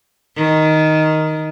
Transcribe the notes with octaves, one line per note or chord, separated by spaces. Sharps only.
D#3